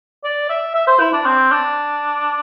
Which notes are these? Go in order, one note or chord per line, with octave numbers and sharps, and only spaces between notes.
D5
E5
E5
C5
E4
D4
C4
D4